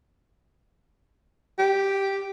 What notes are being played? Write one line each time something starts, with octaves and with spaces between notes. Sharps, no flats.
G4